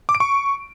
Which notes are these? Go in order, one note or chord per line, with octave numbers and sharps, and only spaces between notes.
D6
D7
C#6